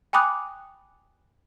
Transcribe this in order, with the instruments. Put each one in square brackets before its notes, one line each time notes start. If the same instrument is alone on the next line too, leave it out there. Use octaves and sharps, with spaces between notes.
[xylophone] G5 G#5 B5 D6 D#6 F#6